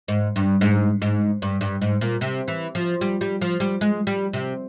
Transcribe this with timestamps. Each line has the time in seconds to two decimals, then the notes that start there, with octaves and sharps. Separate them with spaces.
0.08 G#2
0.36 G2
0.61 G#2
1.02 G#2
1.42 G2
1.61 G2
1.81 G#2
2.01 A#2
2.21 C3
2.48 E3
2.75 F3
3.01 G3
3.21 G3
3.41 F3
3.60 G3
3.81 G#3
4.07 G3
4.33 C3